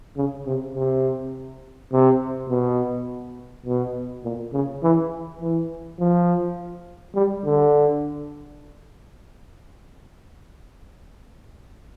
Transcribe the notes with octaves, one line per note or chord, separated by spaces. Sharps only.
C#3
C3
C3
C3
B2
B2
A#2
C#3
E3
E3
F3
G3
D3